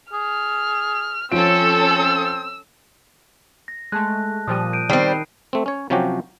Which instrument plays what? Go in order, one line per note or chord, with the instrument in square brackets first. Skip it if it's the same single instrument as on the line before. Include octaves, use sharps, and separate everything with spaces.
[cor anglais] G#4 [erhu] F6
[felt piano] F3 D7 [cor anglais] C4 [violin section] C#4 A4 [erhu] E6
[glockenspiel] A#6
[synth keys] G#3 A3 [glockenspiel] A5 F#6
[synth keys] A#2 F3 G3 [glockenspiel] D#6 D#7
[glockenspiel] G6 D7 D#7
[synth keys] D#3 [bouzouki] G3 C4 [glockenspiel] B5 C7
[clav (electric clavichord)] A3 C4
C#4 C#5
C3 F3 F#3 C#4 F#4 G4